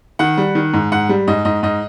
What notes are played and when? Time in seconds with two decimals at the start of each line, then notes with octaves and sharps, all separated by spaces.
0.19 D#3 F#5
0.37 G3
0.55 D#3
0.73 G#2
0.92 G#2 F#5
1.09 G3
1.27 G#2 D#5
1.45 G#2 D#5
1.63 G#2 D#5